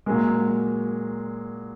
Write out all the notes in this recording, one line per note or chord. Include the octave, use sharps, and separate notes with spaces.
A#2 F#3 G#3 A#3